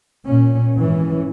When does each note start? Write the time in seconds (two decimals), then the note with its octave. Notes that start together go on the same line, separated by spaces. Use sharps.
0.24 A#2 C#4
0.76 G#1 E3 C#4